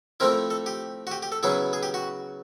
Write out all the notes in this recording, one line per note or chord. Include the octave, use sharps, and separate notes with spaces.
F3 A3 C4 E4 A#4
A4
G4
F#4
G4
G4
A4
C#3 F#3 B3 E4 G#4
G#4
G4
F#4